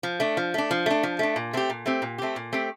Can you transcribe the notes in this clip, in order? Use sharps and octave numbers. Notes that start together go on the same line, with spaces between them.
F3
A3 D4
F3
A3 D4
F3
A3 D4
F3
A3 D4
A#2
A3 C4 G4
A#2
A3 C4 G4
A#2
A3 C4 G4
A#2
A3 C4 G4